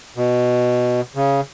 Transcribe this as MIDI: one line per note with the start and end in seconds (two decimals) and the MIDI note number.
0.17 1.01 47
1.15 1.41 49